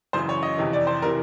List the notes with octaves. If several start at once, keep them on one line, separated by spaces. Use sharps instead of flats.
F#2 C#3 E3 C5
C#5
D#5
F2 C3 E3
D5
C5
C3 E3 A#4